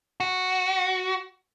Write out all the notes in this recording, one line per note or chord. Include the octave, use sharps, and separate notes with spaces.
F#4